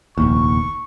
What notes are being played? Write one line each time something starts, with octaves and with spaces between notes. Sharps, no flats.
F1 A#1 D#2 C#6